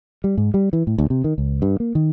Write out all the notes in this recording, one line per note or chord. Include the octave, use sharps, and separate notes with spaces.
G3
G#2
G3
E3
A2
D2
C3
D#3
C#2
G2
A#3
D#3